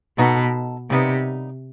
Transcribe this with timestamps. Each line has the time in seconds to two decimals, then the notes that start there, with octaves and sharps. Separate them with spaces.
0.18 B2 B3 D#4 F#4 A4
0.90 C3 D#3 G3 B3 D#4